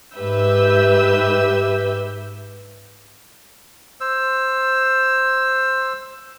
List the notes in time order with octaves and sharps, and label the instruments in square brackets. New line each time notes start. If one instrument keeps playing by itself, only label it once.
[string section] G#2 G4 B4 E5 E6 G6
[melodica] C5 E6